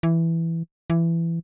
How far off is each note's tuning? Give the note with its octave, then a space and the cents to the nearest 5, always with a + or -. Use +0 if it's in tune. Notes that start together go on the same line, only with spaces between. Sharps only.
E3 +5
E3 +20